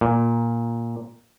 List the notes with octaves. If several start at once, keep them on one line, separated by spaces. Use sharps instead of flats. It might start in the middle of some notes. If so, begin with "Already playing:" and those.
A#2